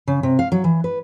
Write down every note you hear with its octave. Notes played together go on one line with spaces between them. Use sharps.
C#3
C3
F5
F#3
E3
B4